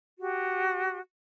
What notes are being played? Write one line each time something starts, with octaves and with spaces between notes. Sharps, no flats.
F#4 G4